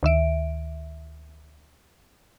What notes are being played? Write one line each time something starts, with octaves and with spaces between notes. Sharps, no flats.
D2 D#3 E5 D7